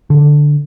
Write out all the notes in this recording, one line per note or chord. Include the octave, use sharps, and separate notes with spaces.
D3